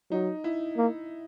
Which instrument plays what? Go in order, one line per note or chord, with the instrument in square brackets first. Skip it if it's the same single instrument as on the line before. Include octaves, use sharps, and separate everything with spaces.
[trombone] F#3 [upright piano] D#4
[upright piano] E4
[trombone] A#3